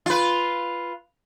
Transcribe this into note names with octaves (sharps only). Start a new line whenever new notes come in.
F4 B4